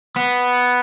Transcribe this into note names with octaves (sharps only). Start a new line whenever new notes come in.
B3